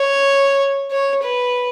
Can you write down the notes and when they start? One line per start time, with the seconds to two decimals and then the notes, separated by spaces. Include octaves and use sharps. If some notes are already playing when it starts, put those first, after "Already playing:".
Already playing: C#5
0.91 C#5
1.23 B4